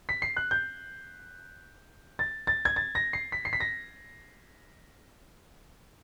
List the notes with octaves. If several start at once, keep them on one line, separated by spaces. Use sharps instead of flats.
B6
C7
F#6
G6
A6
A6
G#6
A6
A#6
C7
B6
C7
B6
A#6